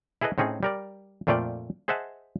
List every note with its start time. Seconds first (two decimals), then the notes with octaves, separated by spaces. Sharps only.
0.21 E4 G#4 A4 B4 D#5
0.38 A2 C4 C#4 D#4 G#4
0.63 G3 A#4 D5
1.27 F2 A#2 A3 F4 D5 G5
1.88 G#4 C5 D#5 E5 F#5 A5